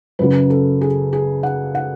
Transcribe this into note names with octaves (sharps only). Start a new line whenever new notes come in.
F#2 C#3 F#3 B4
A4
G#4
G#4
F#5
F#5